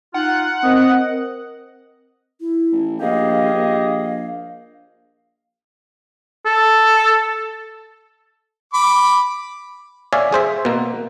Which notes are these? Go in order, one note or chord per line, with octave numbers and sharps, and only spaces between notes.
D#4 F4 F#5
C4 A#4 D#5
E4
A1
A#1 G4 G#4 D#5 F5
A#1
F5
A4
B5 D6
C#5 D5 E5 F5 G#5
G#4 C5 E5
B2 A#3